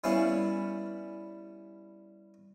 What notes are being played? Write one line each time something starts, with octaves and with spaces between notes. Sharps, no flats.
G3 B3 C#4 E4 F5